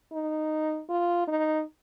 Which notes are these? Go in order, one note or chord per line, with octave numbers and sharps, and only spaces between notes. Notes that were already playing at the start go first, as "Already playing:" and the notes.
D#4
F4
D#4